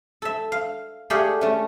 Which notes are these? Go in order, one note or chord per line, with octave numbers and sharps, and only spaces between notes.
A4 E5
F5
A3 G4 G#4 D5 F5 F#5
A3 C#4